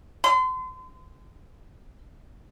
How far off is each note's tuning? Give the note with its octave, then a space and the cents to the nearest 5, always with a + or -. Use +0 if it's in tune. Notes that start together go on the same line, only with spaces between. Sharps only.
C6 -35